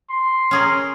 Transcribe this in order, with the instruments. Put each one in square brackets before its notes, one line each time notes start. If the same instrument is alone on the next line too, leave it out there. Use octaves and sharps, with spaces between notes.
[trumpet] C6
[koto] C#4 G#4 A#4